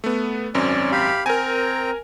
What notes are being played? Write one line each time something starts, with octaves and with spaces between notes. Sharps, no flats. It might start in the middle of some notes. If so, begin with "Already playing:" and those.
A3 B3
G#1 F#2 C4 C#4 D5
G4 F5 B5
C4 A#4 G5 G#5 A#5